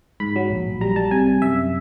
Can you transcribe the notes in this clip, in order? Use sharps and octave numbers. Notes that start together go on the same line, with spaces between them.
G#2 B5
F#3
A#1
A#1
G3 A#5
G3 A5
C3 G#5
C3
F#2 E5